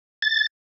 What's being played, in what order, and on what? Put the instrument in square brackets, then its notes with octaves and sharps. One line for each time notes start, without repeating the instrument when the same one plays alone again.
[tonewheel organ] A6